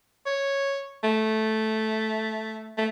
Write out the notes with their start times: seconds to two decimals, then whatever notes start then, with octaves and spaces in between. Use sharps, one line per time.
0.26 C#5
1.04 A3
2.78 A3